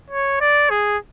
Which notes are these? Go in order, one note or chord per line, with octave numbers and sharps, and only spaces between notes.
C#5
D5
G#4